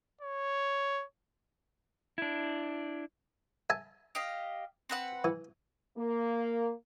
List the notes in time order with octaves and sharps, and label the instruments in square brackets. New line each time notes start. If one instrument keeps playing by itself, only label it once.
[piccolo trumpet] C#5
[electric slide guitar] D4 E4
[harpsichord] E5 G#5 A5
[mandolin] G4 D#5 F5
C4 B4 F#5
[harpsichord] E3
[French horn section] A#3